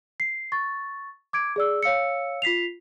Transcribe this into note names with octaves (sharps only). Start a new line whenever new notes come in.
C7
C#6 A6
D6 G#6 D7
G#4 D5 E6
C#5 F5 E6 C#7
F4 B6 C7 F7